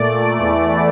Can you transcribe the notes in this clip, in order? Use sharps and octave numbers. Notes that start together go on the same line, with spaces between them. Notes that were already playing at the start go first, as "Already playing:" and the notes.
Already playing: A#2 A3 D5
E2 E3 A3